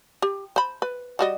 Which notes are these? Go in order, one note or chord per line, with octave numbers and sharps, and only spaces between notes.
G4
C5 B5
B4
G3 F#4 D#5